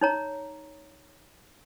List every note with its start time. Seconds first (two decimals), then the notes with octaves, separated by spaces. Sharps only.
0.01 D#4 C#5 A#5